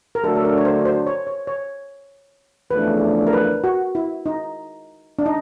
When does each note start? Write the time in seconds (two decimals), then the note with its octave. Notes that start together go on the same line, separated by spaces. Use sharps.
0.15 A#4
0.23 D3 F#3 A3 D4 F#4 A4
0.35 A4
0.45 A#4
0.57 C#5
0.65 C5
0.85 C5
1.07 C#5
1.27 C#5
1.47 C#5
2.71 E2 C#3 F3 A3 D4 B4
3.27 A#4
3.33 B4
3.64 F#4
3.95 E4
4.26 D#4
5.19 D4
5.26 D#4